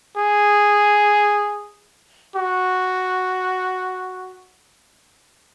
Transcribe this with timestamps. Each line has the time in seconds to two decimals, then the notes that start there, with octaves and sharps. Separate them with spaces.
0.17 G#4
2.36 F#4